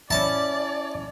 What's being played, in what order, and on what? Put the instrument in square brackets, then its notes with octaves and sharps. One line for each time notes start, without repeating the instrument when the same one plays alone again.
[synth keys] C#4 E4 [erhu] D5 [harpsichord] A5